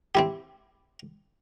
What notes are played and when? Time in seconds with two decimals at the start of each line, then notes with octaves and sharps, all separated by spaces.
0.15 C4 E4 G4